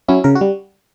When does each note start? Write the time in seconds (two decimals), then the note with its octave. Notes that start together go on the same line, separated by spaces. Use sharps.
0.08 F#3 C#4 E4
0.24 C#3 A#4
0.35 F#4
0.41 G3